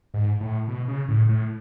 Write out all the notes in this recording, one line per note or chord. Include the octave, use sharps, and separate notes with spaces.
G#2
A2
B2
C#3
A2
A2